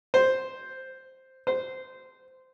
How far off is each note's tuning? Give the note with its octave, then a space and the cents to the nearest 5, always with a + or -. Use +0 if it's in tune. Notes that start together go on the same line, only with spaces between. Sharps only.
C5 +0
C5 -15